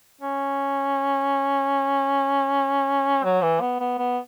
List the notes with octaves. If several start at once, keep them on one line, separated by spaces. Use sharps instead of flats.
C#4
F#3
E3
B3
B3
B3